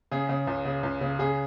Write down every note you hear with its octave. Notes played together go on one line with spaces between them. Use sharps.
C#3 G#4
C#3
C#2
C#3
C#2
C#3
C#3 G#4